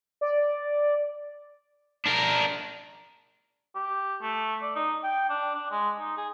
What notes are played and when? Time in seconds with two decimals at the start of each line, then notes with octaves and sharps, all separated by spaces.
0.21 D5
2.06 D4 A#4
3.75 G4
4.22 A3
4.61 D5
4.76 D#4
5.04 G5
5.30 D4
5.55 D4
5.71 G#3
5.99 D#4
6.17 G#4